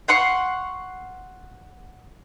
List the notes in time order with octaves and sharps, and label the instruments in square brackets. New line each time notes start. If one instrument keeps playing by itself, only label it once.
[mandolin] F5 F#5 C6 C#6